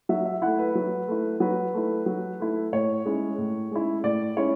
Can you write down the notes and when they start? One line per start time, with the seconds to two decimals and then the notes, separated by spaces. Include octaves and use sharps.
0.09 F#3 E5
0.25 E5
0.42 A3 E4 F#5
0.59 B4
0.75 F#3
1.08 A3 E4
1.40 F#3 B4
1.74 A3 E4
2.06 F#3
2.40 A3 E4
2.72 A2 C#5
3.05 G#3 C#4 E4
3.38 A2
3.71 G#3 C#4 E4
4.04 A2 D5
4.37 G#3 C#4 E4 C#5